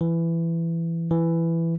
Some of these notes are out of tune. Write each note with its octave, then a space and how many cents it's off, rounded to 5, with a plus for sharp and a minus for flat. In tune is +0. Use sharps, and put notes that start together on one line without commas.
E3 +15
E3 +10